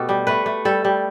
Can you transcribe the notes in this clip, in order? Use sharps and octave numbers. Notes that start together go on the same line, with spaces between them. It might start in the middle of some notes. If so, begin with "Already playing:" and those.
Already playing: B2 A3 G4 A4
G3
A3 B4
A3
G3 A4
G3